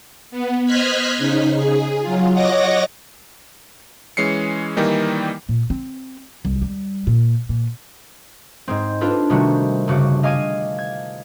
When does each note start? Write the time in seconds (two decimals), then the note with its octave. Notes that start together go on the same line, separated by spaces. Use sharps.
0.31 B3
0.65 C5 D#5 F6 F#6 G#6 B6
1.18 C#3 D#4
1.57 G#4
2.01 F#3 F4
2.34 C#5 D#5 F#5 D6 A#6
4.17 E3 G#3 C#4 C7 C#7
4.77 D#3 E3 G3 A#3 D#4
5.49 A#2
5.70 C4
6.45 C2
6.62 G3
7.07 A#2
7.49 A#2
8.68 G#2 G#3 C4
9.01 D4 F4 A4 B4
9.30 C3 D#3 G3 A3 F#4
9.87 G1 C#3 F#4 D6
10.23 D#5 F5 G#5 D6 G#6 D#7
10.78 G#6